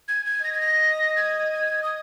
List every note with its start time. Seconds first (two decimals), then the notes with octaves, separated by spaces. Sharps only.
0.08 G#6
0.26 G#6
0.44 D#5 A#6
0.52 G#6
0.61 A#6
1.16 G#6
1.52 G#6
1.83 D#6